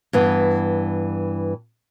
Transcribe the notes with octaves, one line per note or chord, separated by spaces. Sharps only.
G2 E3 B3